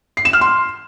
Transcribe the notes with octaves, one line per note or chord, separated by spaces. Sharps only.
C7
E7
F6
C6